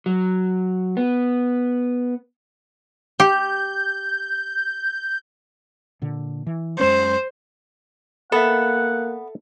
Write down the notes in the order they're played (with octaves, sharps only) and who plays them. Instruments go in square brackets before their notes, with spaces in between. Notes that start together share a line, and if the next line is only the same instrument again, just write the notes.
[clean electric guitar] F#3
B3
[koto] G4 [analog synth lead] G6
[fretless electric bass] A#2 D3
E3
[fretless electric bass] F#2 G#3 C#4 [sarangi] C5
[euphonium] A#3 [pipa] B3 [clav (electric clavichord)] A4 E5 [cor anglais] F#5